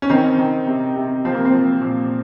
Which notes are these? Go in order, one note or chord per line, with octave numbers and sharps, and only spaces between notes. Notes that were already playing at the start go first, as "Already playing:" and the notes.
C#4
D#3 C4
D#3
C3
C3
F3 C4
A#3
C4
F3
A#2